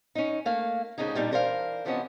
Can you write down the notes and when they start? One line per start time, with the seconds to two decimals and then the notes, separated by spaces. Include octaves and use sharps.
0.15 C#4 D#4
0.45 A3 A#3 F5
0.98 D2 A2 C#3 F3 D#4 G#4
1.15 A#2 G3 D4 D#4
1.31 E3 D4 A#4 C5 D5 F5
1.85 C3 E3 F3 B3 C#4 D#5